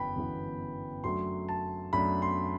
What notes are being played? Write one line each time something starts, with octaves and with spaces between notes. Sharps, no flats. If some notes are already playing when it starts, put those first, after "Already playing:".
Already playing: G1 F#2 E3 B3 G5 B5
G1 F#2 E3 B3
F#2 F#3 A3 D4 C6
A5
F#2 F#3 A3 D4 B5
C6